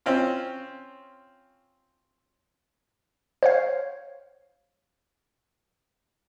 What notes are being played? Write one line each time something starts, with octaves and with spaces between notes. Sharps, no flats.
C4 C#4 F4
C5 C#5 F5